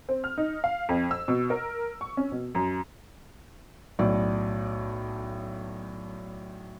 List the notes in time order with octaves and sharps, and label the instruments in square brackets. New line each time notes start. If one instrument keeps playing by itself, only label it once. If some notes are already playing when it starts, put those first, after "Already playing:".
[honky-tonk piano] C4
F6
D#4
F5
F2
E6
B2
A#4
C#6
C#4
B2
F#2
[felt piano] B1 A2 D5